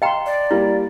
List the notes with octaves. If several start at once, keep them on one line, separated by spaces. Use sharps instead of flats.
D#5 F5 G5 A#5 C6
D5
G3 A#3 E4